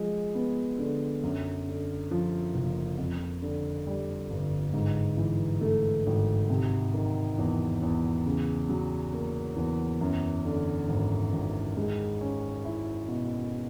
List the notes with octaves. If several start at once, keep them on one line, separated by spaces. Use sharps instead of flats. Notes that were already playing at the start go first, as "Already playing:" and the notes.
Already playing: F3 G#3
B3
D3
F#2
D3
F3
F#1
F2
D3
G3
G1
G#2
E3
A3
G#1
C3
D#3
E2
E2
C#3
F#3
A#3
E2
F#2
D3
G#1
G#1
G#3
C#4
E4
B2